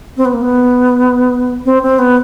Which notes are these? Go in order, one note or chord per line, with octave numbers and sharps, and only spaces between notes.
C4
B3
A#3
B3
C4
C4
B3